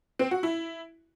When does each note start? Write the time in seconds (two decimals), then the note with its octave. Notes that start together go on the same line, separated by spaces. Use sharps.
0.19 C4
0.31 F#4
0.43 E4